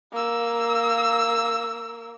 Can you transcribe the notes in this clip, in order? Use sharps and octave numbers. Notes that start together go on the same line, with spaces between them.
A#3 E6